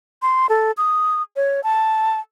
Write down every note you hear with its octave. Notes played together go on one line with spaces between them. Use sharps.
C6
A4
D#6
C#5
A5